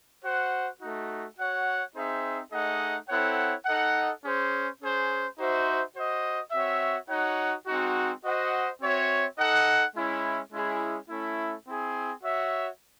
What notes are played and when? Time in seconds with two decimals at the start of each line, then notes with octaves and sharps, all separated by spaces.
0.23 F#4 C5 F#5
0.80 A3 D#4 F#4
1.37 F#4 C#5 F#5
1.95 C4 D#4 G#4 C5 E5
2.52 A3 D#4 G#4 D#5 F#5
3.08 C4 E4 A4 C#5 F#5
3.66 D#4 A4 D#5 F#5
4.23 C#4 G#4 C5
4.80 C#4 G#4 C5
5.37 D#4 F#4 C5 E5
5.94 F#4 C5 D#5
6.52 C4 F#4 C#5 E5
7.08 D#4 F#4 C#5 F#5
7.66 G#3 C4 D#4 F#4
8.23 F#4 C5 D#5 F#5
8.80 C4 F#4 C#5 E5
9.37 D#4 A4 D#5 F#5
9.94 G#3 C#4 E4
10.52 G#3 C#4 E4 G#4
11.09 A3 C#4 E4
11.66 C4 E4 G#4
12.23 F#4 C#5 E5